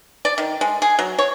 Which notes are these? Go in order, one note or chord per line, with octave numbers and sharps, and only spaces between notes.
D5
D#3
G#3
G#4
F#3
C#5